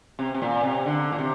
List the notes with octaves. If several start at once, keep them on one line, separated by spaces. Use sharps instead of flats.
C3
C3
A#2
C3
D3
A#2
C3